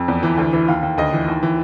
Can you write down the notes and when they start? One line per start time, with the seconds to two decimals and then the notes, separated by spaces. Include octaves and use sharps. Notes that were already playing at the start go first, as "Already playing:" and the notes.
Already playing: F2
0.08 E2
0.23 E3
0.38 D2
0.53 E3
0.68 D#2 F5
0.83 D#2
0.98 D2 D#5
1.13 E3
1.28 D#2
1.43 E3